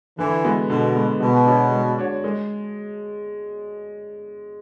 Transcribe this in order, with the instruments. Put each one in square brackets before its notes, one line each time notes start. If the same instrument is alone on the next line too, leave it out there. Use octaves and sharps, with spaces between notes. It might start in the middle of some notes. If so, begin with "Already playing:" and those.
[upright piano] D3 [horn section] E3
[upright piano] G#3 B3 F#4
[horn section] B2 [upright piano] D3
[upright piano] G#3 B3 F#4
[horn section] B2 [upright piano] G#3
[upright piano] D4 F#4 C#5
G#3
D4 F#4 C#5
G#3